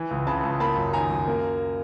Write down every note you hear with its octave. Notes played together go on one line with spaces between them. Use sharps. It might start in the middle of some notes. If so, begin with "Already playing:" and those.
Already playing: E3
C#2
C#3 A5 B5
C#2
A#3 A5 B5
F#2
D#3 G#5 A#5
F#2
A#3